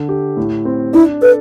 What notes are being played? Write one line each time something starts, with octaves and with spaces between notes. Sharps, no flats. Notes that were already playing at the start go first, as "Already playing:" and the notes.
Already playing: D3
G4
A2
C4
D4 E4
A4 B4